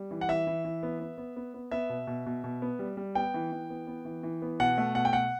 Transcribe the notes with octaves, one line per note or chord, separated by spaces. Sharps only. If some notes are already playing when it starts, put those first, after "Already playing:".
Already playing: G3
E3
F#5
E3 E5
E3
E3
B3
B3
B3
B3
B3
B3 E5
B2
B2
B2
B2
B3
G3
G3
B3 G5
E3
E3
B3
B3
E3
E3
B3
B2 F#5
A3
B2 F#5
G5
B2 F#5